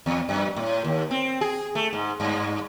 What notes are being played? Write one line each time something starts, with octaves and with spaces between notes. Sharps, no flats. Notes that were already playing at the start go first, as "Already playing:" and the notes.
E2
F#2
A2
D#2
C4
G#4
A3
G#2
G2